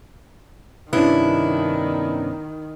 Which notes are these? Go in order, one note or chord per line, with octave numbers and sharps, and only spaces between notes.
G2 C3 D#3 B3 C#4 D4 E4